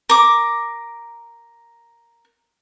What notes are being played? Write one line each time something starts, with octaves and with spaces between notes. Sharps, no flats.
A#4 D6